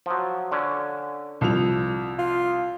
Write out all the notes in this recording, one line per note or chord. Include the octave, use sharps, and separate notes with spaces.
F3 F#3
D3 C#4
C2 F3 F7
F4